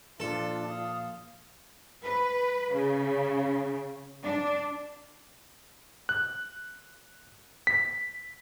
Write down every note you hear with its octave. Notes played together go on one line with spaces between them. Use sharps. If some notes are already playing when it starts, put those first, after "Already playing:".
A#2 F3 D4 F4 A4
F5 D#6
B4
C#3
D4
F#6
B6